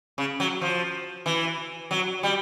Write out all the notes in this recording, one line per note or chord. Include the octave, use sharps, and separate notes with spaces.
C#3
F#3
F3
E3
F#3
G3